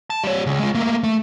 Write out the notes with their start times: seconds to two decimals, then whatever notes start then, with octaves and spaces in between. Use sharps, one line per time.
0.10 A5
0.24 G3 C#5
0.46 C#2
0.59 G#3 F4
0.75 A3 A#3
1.03 A3